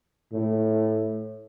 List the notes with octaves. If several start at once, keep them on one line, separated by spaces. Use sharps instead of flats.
A2